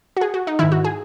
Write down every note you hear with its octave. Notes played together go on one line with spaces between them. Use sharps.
F#4
G#4
F#4
D#4
G#2 D#3 E4
F#4
G#4